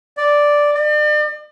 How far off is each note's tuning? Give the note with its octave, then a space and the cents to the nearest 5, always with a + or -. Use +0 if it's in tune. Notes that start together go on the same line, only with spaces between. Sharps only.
D5 +0
D5 +40